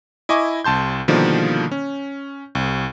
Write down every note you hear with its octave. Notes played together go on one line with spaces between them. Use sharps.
E4 D#5 G#5 C#6 D6
C2 A5 C6 G6
B2 D3 D#3 F3 G3 A#3
C#4
C2